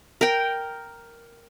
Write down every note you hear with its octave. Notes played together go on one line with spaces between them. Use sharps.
A#4 G5